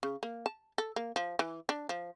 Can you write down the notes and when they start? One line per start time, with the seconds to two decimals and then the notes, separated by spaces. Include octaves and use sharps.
0.03 C#3
0.23 A#3
0.46 A5
0.78 A4
0.96 A#3
1.16 F3
1.39 E3
1.69 D4
1.89 F3